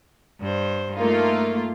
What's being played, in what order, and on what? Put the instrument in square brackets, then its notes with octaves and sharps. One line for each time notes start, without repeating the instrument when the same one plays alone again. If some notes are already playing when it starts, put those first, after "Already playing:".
[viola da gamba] G2 C5
[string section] A3 A#3 F4 [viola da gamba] D#4